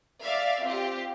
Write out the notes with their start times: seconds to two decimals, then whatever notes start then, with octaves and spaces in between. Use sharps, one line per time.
0.22 D5 E5 F5
0.62 C4 F4 G4